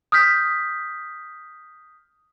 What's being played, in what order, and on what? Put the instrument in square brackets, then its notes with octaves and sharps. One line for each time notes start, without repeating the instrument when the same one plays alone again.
[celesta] D#6 F6 G6 B6